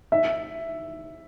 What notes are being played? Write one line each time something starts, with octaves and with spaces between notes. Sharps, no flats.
E5